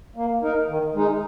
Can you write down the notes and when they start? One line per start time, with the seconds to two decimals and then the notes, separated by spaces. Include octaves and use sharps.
0.16 A#3
0.43 D#4 A#4
0.68 D#3
0.95 G#3 D#4